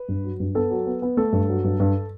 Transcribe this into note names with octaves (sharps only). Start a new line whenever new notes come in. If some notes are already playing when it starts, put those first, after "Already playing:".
Already playing: B4
G2
F#3
G2
B3 A4
F#3
B3
B3
A3 A4
G2
F#3
G2
G2